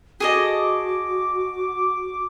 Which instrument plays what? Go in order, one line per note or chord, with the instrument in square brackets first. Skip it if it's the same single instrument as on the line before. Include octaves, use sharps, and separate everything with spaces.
[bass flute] F#4 [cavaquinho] G#4 A4 D#5 [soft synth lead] D6